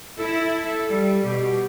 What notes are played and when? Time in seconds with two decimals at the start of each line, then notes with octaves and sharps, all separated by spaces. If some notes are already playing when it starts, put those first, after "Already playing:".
0.18 E4 A4
0.90 G3
1.24 B2 G4